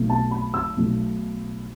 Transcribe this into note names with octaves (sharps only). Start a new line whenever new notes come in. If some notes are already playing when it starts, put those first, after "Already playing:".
Already playing: B1 B2 F#3 A3
A5
B5
E6
B1 B2 F#3 A3